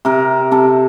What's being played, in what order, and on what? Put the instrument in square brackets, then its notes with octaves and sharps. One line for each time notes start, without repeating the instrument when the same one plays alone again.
[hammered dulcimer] C3 A#4
C3 A4